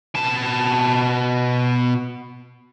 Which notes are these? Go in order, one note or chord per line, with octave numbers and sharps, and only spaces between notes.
B2 A5